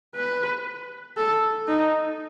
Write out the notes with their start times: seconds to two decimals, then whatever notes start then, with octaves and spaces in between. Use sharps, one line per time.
0.15 B4
1.17 A4
1.67 D#4